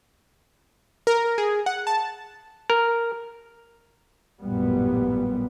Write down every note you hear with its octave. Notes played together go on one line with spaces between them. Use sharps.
A#4
G#4
F#5
A5
A#4
A1 F#2 A#2 G3 B3